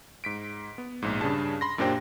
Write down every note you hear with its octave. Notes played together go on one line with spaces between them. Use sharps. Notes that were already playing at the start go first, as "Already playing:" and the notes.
G#2 B6 D7
B3
A#1 G#2
G2 C#3 D4 G#4 A5
B5 C6 A#6
F#2 A#2 D4 G4 C5 G5